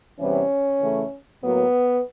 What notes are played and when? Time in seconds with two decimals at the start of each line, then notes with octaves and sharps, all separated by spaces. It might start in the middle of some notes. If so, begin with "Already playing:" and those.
0.19 E2 C3 E3 G3 B3 C#4
0.80 C#3 E3 A3
1.41 A2 F#3 A#3 B3